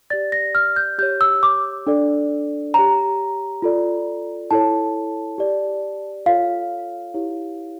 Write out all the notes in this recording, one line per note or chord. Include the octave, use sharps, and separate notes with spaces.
G4 D5 A6
A#6
F6
G6
G4 C#5 G6
E6
D6
D4 A4 D5
G4 C#5 A#5
F4 A4 D5
E4 A4 C#5 A5
G4 D5
F4 A4 C#5 F5
E4 G4 C#5